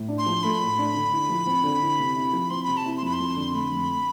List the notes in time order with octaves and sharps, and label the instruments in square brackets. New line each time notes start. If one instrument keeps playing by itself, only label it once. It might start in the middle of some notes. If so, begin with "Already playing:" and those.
Already playing: [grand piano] A2
D4
[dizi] C6
[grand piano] F3
[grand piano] A3 [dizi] B5
[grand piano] A2
D4
D3
E4
F3
C4
D3
E4
C3
E4
F3
[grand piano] C4 [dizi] C6
[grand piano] C3 [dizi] B5
[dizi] A5
[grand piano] E4
[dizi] C6
[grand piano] F2 [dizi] B5
[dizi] C6
[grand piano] F2
D3
[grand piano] A3 [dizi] B5
[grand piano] F2